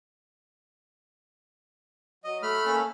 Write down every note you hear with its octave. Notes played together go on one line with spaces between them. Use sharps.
F#3 D#5
A3 B5 F6
A#3 C#4 A4